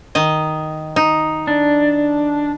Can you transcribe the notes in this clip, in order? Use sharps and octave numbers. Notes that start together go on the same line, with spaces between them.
D#3 D#5
D#4
D4